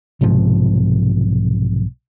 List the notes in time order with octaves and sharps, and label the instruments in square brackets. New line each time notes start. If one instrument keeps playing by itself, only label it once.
[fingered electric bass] B1 G#2 C3 F3